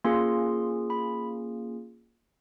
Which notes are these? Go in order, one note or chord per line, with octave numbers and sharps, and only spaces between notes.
A#3 C#4 F4 G#4 C6
B5